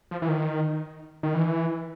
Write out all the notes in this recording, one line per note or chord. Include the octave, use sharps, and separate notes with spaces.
F3
E3
D#3
D#3
E3